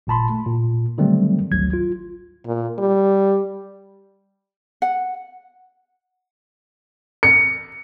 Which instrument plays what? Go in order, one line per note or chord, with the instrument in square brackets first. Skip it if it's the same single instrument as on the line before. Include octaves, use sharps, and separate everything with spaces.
[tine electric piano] G#1 A#2 A5 B5 C6
A3
A#2
D3 D#3 F#3 G3 A3 C4
G#1 D2 F#3 G#6
F4
[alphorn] A#2
G3
[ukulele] F#5
[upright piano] C#7